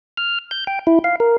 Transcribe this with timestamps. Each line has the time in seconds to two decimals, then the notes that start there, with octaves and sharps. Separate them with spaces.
0.17 F6
0.51 G6
0.67 G5
0.87 E4
1.04 F5
1.20 A#4